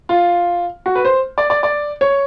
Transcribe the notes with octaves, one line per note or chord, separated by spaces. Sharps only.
F4
F#4
B4
C5
D5
D5
D5
C#5